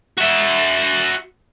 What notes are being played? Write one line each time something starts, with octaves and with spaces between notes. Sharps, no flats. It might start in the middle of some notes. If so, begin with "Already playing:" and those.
F#4 E5